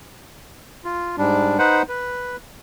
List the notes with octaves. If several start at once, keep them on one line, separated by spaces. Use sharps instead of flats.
F4
G#2 G3 D4
D#4 B4 C5 F#5
B4